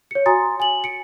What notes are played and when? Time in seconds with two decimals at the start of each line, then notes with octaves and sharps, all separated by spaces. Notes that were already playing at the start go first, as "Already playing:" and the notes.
0.11 C#5 C#7
0.26 F#4 G#5 A#5 C6 D#6 A6
0.60 G#5 F#7
0.84 C#7 D7